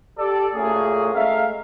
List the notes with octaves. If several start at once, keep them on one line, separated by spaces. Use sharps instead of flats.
G4 A4 D5
A#2 A3 A#3 C#4 F#4 G#4
G#3 A3 A#4 E5 F5